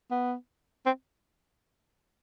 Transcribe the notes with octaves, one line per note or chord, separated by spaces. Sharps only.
B3
C4